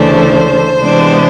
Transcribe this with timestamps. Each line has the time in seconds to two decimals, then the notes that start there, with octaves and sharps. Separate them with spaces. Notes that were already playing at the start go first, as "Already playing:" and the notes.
Already playing: D2 C#3 E3 A3 D4 C5
0.79 C3 E3 G#3 B3 D4